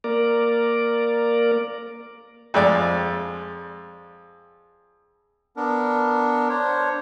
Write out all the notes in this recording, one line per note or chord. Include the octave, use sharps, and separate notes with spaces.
A#3 A#4 D5
F2 G#3 D5
B3 D4 A#4
D4 C5 C#5